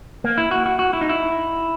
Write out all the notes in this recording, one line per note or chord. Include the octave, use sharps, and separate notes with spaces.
A#3
E4
F#4
F#4
F#4
E4
D#4
E4